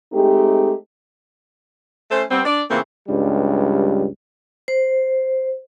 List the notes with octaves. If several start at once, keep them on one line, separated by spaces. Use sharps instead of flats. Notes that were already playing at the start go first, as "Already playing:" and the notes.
G#3 A3 C4 D#4 G4
A3 C#4 A4 C5
G3 B3 C4
D4 D5
A#2 C#3 E3 A3 A#3 C4
C#2 G2 G3
C5